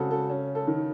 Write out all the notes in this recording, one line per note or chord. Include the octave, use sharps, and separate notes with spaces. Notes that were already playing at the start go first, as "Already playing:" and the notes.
Already playing: C#3 C4 F#4 A4
A4
C#4
A4
D#3